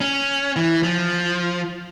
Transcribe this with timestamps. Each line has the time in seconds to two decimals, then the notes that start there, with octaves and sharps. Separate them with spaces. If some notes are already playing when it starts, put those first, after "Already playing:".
0.01 C#4
0.56 E3
0.83 F3